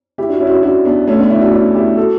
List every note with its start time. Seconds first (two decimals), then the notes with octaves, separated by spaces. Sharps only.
0.18 E4 G4
0.29 D4 F#4
0.40 C#4 E4
0.47 F#4
0.52 C#4 E4
0.63 D4 F#4
0.85 B3 D4
1.07 A3 C#4
1.19 B3 D4
1.30 C#4 E4
1.41 D4 F#4
1.52 C#4 E4
1.75 E4 G4
1.97 F#4 A4